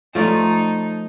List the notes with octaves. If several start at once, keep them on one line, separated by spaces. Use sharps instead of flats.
F3 A3 D#4 D5